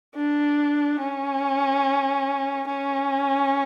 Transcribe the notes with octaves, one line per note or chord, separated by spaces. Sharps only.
D4
C#4
C#4